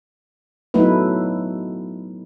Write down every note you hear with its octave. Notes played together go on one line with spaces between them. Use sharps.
F#3 A3 B3 D#4 E4 B4